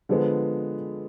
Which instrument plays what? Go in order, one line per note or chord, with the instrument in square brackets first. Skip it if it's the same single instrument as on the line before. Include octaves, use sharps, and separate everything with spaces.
[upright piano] D3 F3 G#3 B3